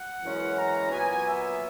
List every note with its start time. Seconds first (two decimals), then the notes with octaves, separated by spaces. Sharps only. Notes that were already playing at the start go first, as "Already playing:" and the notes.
Already playing: F#5
0.22 F#2 E3 G#3 C#4
0.57 A#5
0.91 A#2 F#3 B3 G#5
1.26 E5